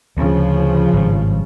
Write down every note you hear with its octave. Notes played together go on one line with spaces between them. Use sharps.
D2 C#3 F3
G#1 G2